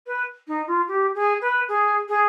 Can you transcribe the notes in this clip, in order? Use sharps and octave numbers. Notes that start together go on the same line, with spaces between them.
B4
D#4
F4
G4
G#4
B4
G#4
G#4